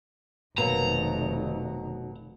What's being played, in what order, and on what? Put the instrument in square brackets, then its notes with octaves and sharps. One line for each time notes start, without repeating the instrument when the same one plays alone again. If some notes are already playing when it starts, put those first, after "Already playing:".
[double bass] F1 D#3 [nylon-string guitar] B2 F#3 A#3 [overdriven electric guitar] A#5